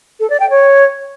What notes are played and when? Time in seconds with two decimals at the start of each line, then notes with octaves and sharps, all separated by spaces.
0.20 A4
0.30 D5
0.40 G5
0.50 C#5